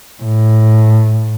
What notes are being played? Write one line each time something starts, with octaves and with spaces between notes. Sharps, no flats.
A2